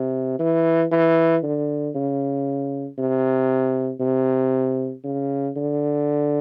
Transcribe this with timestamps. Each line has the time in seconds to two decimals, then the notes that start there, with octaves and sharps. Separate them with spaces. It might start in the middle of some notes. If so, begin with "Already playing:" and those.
Already playing: C3
0.39 E3
0.92 E3
1.43 D3
1.95 C#3
2.98 C3
4.00 C3
5.04 C#3
5.56 D3